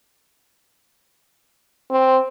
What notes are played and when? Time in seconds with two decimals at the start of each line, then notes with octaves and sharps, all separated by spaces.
1.90 C4